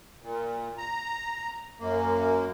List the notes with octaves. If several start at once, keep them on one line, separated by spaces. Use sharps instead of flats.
A#2
A#5
F#2 A#3